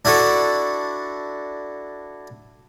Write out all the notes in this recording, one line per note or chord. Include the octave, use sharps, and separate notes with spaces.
D4 E4 F#4 A4